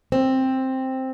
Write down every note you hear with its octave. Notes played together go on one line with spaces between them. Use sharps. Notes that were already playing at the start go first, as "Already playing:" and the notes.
C4